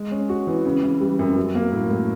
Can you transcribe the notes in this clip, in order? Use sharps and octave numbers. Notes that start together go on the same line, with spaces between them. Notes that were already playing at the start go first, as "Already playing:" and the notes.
Already playing: G#3
C#4
F#4
E3
C#3
E3
G3
F#2
F#3
A#3
A2
A2